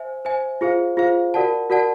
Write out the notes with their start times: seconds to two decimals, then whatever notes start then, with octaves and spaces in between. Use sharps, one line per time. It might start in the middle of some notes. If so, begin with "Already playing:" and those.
Already playing: C5 E5 G#5
0.25 C5 E5 G#5
0.61 F4 G#4 C5 F5
0.97 F4 G#4 C5 F5
1.34 F#4 A#4 D5 F#5 A5
1.70 F#4 A#4 D5 F#5 A5